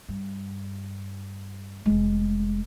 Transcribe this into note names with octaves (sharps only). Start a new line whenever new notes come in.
G2
F1 G#3